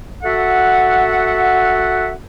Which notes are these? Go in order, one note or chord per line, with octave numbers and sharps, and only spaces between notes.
F#4 A4 E5 F#5